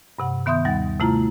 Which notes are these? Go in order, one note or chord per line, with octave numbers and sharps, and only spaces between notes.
G2 C3 F#5
D#3 B3 E5 C6 D#6 G6
D#2 G3 F#5 A6
C3 A3 E4 F4 A#5